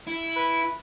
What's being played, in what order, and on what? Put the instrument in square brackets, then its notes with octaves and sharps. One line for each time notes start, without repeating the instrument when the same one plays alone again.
[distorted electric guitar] E4
[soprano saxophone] B4